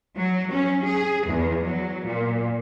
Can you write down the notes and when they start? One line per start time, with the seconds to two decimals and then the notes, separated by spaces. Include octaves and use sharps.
0.16 F#3
0.52 C#4
0.84 G#4
1.26 E2
1.64 F#3
2.05 A#2